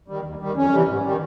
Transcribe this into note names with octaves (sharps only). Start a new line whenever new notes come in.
D#3 G3
D#2
D#3 G3
F2 C#4
C3 E3 G3
G#2
D#3 G3